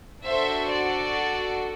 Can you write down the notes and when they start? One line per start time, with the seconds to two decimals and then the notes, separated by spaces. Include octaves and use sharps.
0.24 D4 F#4 A4 C5 E5
0.70 D5